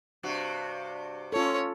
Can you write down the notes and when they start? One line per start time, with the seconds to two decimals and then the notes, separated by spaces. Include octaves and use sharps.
0.23 G2 C3 F#4
1.32 C#4 F4 A4 C#5